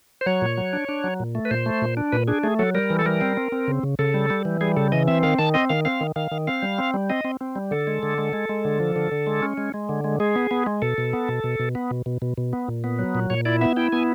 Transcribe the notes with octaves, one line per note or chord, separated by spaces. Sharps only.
C5
F#3 C#5
A#2
F#3
D4
D4
F#3
A#2
A3
B4
A#2 C5
A3
A#2
D4
A#2 B4
D4 G#4
A3 G#4
F#3 A4
G3 A#4
E3
A4
G3 A#4
C4
C4
C4
C#3
C#3
C#3 A4
G3
G3
E3
G3 G#4
C#3 A4
E3 D#5
C4 E5
D#3 F5
D#3 A5
C4 D#5
D#3 F5
C4 F5
D#3
D#3 F5
D#3
C4 F5
G3
C4
G3
C4 D#5
C4
C4
G3
D3 A4
G#3
D3
G#3
G#3
G#3
D3
F3
D3
D3
G#3
C#4
G#3
G#3
D3
G#3
G#3 G#4
B3
B3
G#3
B2 A4
B2
B3
B2
B2
B2
B3
B2
B2
B2
B2
B3
A#2
B3
F#3
A#2
A#2 C#5
E4 D5
B3 E5
E4 G5
B3 G#5